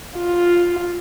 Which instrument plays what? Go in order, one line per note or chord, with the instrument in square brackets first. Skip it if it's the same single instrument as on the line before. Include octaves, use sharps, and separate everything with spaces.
[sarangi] F4